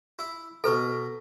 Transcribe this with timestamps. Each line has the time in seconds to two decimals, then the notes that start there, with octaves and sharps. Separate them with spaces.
0.19 E4
0.64 B2 A4 B4 A#5